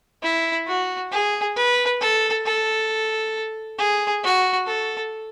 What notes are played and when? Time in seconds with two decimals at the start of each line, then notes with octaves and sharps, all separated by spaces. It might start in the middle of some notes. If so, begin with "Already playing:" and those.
0.23 E4
0.67 F#4
1.12 G#4
1.56 B4
2.01 A4
2.46 A4
3.79 G#4
4.24 F#4
4.68 A4